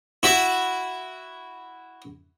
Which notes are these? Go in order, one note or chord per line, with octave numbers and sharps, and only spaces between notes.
E4 F#4 E5